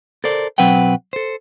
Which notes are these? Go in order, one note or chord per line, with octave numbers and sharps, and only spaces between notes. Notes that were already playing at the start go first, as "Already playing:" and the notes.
A4 A#4 C5 D5
B1 F#3 C4 B4 F#5 G5
A4 C5